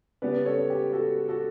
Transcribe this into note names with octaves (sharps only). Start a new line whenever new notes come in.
C#3 G3 B3 B4 D5
A4 C#5
G4
F#4 A4
F#4 A4